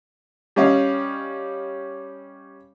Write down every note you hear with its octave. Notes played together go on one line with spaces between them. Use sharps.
G3 C#4 D#5 F5